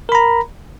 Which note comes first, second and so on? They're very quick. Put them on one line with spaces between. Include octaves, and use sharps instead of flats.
A#4 B5 A#5